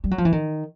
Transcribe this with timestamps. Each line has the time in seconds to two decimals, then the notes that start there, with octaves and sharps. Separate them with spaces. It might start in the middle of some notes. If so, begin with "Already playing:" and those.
0.04 G3
0.11 F#3
0.18 F3
0.25 E3
0.32 D#3